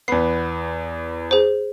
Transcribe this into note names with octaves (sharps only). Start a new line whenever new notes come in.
E2 B3 C7
G#4 C5